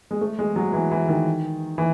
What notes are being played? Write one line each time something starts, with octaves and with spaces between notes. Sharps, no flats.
G#3
A3
G#3
F#3
E3
E3
D#3
E3